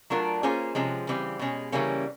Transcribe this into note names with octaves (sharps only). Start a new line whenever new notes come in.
F#3 A3 D4 F4 A#4
A#3 C#4 F4 G#4 C5
C3 F3 G#3 C#4
C#3 E3 G3 C4
B2 G#3 C#4
C#3 E3 G3 A#3 C#4